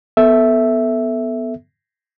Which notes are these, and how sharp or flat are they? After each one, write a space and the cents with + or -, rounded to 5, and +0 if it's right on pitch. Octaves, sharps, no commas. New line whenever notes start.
B3 +0 A4 +0 E5 +0